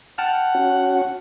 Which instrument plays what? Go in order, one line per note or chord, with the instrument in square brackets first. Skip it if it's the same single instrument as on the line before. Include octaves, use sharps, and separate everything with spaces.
[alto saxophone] F#5 [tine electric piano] G5 A5 F6
[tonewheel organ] C#4 F#4